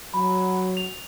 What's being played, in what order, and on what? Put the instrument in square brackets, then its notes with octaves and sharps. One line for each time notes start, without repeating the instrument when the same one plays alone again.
[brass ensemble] F#3 [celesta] B5
[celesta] F7